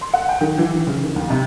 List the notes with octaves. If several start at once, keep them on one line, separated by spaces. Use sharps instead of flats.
C6
F#5
G5
D#3
E3
E3
C#3
D#3
D#2
C3